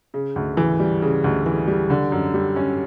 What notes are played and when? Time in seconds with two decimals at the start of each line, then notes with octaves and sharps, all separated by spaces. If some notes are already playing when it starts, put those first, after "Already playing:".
0.14 C#3
0.36 D2
0.57 E3
0.80 G3
1.02 C#3
1.24 D2
1.46 E3
1.68 G3
1.90 D3
2.12 F#2
2.34 G3
2.56 C#4